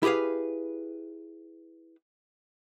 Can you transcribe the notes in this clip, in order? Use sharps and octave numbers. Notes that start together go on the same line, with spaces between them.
E4 G4 G#4 B4 F5